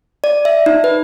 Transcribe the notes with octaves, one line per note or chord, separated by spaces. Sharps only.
D5
E5
D#4
B4